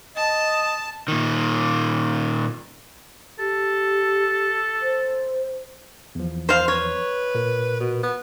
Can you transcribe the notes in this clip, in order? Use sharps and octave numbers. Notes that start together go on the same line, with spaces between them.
D#5 A5
A#2 D#3
G4 A4
C5
E2 F3
C5 F5
B4 C#5
A#2 A#4
B2
B3